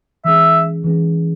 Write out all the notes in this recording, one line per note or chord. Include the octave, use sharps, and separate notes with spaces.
E3 G#3 C#4 G#4 E5
E3 G#3 C#4 G#4